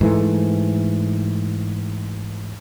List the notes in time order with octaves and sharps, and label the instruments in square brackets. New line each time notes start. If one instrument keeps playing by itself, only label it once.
[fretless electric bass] G#2 E3 A3